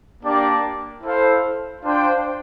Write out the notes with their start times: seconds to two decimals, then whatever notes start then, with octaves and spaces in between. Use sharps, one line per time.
0.22 A#3 D4 G4 D5
1.01 E4 A4 C5 F5
1.81 D4 F4 C5 G5